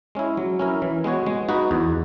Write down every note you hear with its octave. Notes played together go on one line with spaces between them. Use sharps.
G#3 C#4 E4
F#3
C#4 E4 A#4
E3
G#3 B3 F#4 C#5
G#3
D#4 F#4 B4
E2